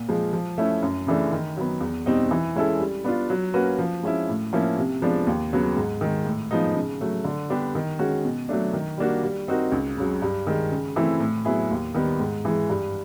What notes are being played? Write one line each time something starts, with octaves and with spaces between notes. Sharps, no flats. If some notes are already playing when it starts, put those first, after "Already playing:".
Already playing: A#2
F3 G#3
F3
A3 C#4 E4
F#2
C#3 E3 A3 D4
D#3
F#3 B3
E2
B2 G3 C4 D#4
E3
G#3 C#4 E4 A4
G3
B3 D4 F4
F#3
A#3 C#4 F#4 B4
F3
G#3 C#4 E4
A2
F3 A#3 C#4 E4
C3
F3 G#3 B3 D4
D#2
C#3 F#3 B3
G#2
D#3 G#3
A2
F3 G#3 B3 D#4
C#3
F#3 A3
D3
G3 B3 D4 G4
D#3
G#3 C#4 F#4
B2
F#3 A3 D4
D#3
G3 A#3 D4 F#4
G3
C4 D#4 F#4 A#4
C#2
C#3 F#3
G2
D#3 G#3
C#3
E3 A3 C4 E4
A2
F#3 B3 E4 G#4
D#2
D#3 G3 B3
G#2
E3 G#3
G2